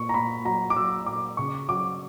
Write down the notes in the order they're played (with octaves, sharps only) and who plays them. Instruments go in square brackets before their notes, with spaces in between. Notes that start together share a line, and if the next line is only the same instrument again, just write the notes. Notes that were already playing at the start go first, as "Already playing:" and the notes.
Already playing: [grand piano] A#2 C#6
A#5
A#2 B5
F#3 A#5
D6
F#3 E6
A#2 D6
C#3 C#6
F#3 D6